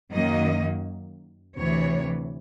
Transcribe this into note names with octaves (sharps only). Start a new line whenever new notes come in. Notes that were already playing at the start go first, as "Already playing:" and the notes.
F#2 D#3 F#3 A#3 D#5
D2 C3 E3 C#5